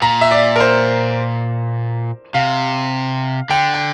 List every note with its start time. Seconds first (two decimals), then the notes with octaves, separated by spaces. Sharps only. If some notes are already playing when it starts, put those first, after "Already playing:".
0.02 A#2 A#5
0.21 E5
0.31 D5
0.56 A#4
0.60 C5
2.34 C3 F5
3.50 D3 G5
3.74 G5